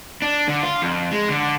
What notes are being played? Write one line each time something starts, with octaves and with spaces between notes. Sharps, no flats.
D4
D3
F4
F2
G#3
D3